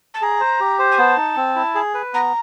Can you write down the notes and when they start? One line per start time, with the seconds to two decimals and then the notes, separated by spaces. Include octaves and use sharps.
0.13 A5
0.22 G#4 A#5
0.40 C5
0.60 G4
0.79 C5
0.91 G#5
0.98 B3 A5
1.17 D#4
1.36 C4
1.56 E4
1.75 G#4
1.94 B4
2.13 B3 A#5